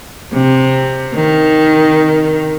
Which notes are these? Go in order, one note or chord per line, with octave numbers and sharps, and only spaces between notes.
C3
D#3